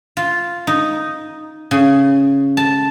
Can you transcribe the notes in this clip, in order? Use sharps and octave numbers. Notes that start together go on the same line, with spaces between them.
F4
D#4
C#3
A5